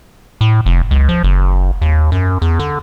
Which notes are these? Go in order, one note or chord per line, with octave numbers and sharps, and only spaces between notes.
A2
F1
C#2
F3
F#1
D#2
F#2
E2
D3